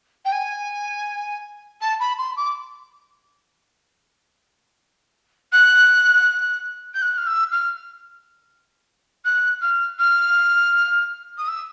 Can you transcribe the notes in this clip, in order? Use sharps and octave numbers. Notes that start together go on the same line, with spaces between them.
G5
G#5
A5
B5
C6
D6
F#6
G6
F#6
F6
E6
F6
F#6
F6
F6
D#6
E6